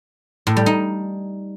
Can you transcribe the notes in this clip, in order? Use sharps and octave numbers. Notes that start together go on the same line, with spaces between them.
A2
G3
D#4